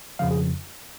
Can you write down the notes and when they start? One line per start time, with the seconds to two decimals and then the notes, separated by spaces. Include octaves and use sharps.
0.19 F2 C#3 F3 F5
0.31 G#4